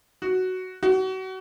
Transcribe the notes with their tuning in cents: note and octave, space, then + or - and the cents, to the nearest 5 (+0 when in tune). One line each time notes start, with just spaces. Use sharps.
F#4 +5
F#4 +30